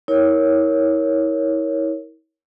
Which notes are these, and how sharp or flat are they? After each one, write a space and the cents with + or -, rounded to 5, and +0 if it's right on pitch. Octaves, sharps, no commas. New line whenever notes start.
E4 -40 A#4 +0 C#5 +0